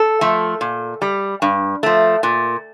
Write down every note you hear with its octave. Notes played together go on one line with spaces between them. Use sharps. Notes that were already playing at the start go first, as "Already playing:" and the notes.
Already playing: A4
F3 A3
A#2
G3
G2
F3 A3
A#2